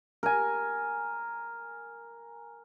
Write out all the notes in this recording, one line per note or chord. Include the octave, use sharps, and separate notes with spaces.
A#4 G#5